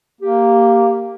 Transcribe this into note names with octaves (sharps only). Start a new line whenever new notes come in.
A#3 G4